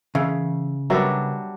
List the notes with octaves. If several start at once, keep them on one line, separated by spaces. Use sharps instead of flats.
C#3 E3 E5 F5
F#3 G3 D4 F#4 A#4 B4 E5 A#5